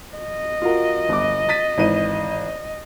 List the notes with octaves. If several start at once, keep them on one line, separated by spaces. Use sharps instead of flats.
D#5
F4 F#4 A#4
G1 D6
A6 B6 D#7
G#1 E3 D#7